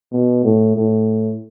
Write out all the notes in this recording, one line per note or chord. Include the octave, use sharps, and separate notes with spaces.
B2
A2
A2